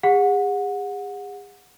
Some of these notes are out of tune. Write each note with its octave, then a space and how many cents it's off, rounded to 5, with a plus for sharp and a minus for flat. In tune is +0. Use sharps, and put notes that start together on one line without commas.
G#4 -40 F#5 -20